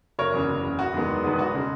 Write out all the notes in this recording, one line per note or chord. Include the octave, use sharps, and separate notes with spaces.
F#1 A#4 C#5
E2 C#3
F#1
E2 C#3
E1 F#4
E2 D#3 G#3 B3
E1
E2 D#3 G#3 B3
E1 F#4
C#3 G#3